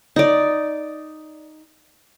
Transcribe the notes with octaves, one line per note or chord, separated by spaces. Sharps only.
D#4 D5